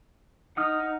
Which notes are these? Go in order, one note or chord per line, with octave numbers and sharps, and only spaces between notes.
D#4 F#5 D#6 F6